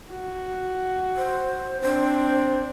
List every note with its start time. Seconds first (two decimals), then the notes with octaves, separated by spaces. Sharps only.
0.10 F#4
1.16 C5
1.82 C4 D4 C5